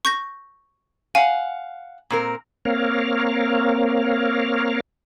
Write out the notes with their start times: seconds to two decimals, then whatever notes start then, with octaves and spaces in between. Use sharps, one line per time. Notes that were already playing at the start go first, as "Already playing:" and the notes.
0.05 C#6 G6 A#6
1.15 F5 F#5 G#5
2.10 A#2 C4 A#4
2.65 A#3 C4 A#4 C#5 F5